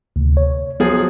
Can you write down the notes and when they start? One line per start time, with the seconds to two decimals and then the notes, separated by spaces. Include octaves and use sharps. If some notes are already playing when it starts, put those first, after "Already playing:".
0.16 D2 C3
0.37 C#5
0.80 F3 F#3 B3 G#4